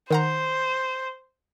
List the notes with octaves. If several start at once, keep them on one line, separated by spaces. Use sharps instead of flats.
D#3 C5 F#5 A#5